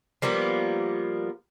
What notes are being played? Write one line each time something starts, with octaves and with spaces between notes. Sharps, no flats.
F3 G3 A#3 B3